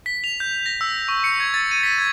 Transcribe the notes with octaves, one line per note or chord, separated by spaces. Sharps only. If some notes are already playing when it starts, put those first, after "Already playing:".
B6
F7
G6
A#6
E6
C#6
C#7
G#6
A6
D#7
B6
G#6